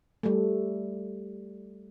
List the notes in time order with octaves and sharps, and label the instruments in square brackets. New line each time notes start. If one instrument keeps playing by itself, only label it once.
[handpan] G3 A3